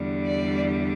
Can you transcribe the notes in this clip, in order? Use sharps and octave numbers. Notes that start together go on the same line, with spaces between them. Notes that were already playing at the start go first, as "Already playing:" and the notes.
Already playing: E2 D3 G3
D5